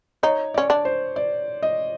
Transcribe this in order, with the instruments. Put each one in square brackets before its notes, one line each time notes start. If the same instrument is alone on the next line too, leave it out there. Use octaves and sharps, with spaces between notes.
[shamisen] D#4 [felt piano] C#5
[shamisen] C#4 [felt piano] D5
[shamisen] D4
[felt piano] C5
D5
D#5